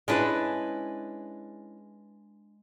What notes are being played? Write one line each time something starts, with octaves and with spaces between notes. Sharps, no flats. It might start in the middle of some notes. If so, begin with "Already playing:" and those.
G#3 C#4 D4 E4 G#4 B4